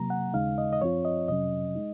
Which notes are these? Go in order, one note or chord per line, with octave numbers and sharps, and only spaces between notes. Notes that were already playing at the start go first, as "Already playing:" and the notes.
Already playing: C3 F#3 A#3 A#5
F#5
D#2 C#3 G#3 D#4 F5
D#5
D#5
F#2 F3 C4 F4 C#5
D#5
F2 C3 F#3 C#4 D#5
G#3 D#4